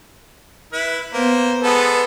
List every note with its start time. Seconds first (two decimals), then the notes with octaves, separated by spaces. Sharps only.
0.73 E4 B4
1.13 A#3 B3 C5
1.63 G#3 B3 A4 B4